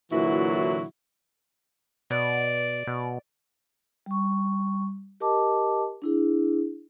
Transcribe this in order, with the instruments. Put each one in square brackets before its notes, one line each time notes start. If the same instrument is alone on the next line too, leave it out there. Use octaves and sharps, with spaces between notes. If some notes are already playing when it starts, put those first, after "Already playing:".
[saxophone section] A#2 D3 E3 F#3 E4 F#4
[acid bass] B2 [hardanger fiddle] D5
[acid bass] B2
[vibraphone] G3 C#6
G4 A#4 D#5 A5 D6
D4 E4 G#4